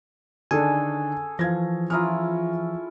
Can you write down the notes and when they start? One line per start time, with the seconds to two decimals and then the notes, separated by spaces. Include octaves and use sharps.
0.51 D3 D#3 C#4 D4 G#4 A4 G#5
1.39 E3 F3 F5 G#6 A#6
1.90 C#4 E4 F4 A#5 D#6 F6